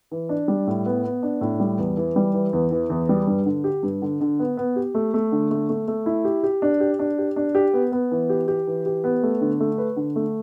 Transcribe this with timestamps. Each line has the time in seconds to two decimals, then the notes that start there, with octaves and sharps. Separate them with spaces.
0.11 E3
0.29 D4
0.48 G3
0.67 A2
0.86 B3
1.04 B3
1.23 D4
1.41 A2
1.60 G3
1.78 E2
1.97 E3
2.16 G3
2.34 E3
2.53 E2
2.71 E3
2.90 E2
3.09 G3
3.27 G2
3.46 D3
3.64 G4
3.83 G2
4.02 D3
4.21 D3
4.39 B3
4.57 B3
4.76 G4
4.94 A3
5.14 A3
5.32 D3
5.51 A3
5.69 A3
5.88 A3
6.06 E4
6.25 G4
6.43 G4
6.62 D4
6.80 G4
6.99 D4
7.18 G4
7.36 D4
7.55 G4
7.74 B3
7.92 B3
8.11 E3
8.29 G4
8.48 G4
8.67 E3
8.86 G4
9.04 B3
9.23 A3
9.41 D3
9.60 A3
9.78 B4
9.96 D3
10.16 A3